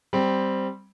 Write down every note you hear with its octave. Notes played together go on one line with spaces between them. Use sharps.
G3 C4